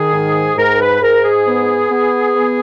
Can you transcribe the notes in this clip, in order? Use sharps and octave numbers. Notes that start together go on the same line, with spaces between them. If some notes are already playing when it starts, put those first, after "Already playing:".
Already playing: D#3 G#4
G#2
G#2 A#4
B4
G#2 A#4
G#4
B3
B3
B3